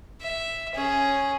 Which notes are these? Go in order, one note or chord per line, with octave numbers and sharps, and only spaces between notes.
E5
C#4 G#4